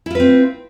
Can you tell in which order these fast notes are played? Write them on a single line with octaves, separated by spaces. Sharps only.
E4 F4 B4 C4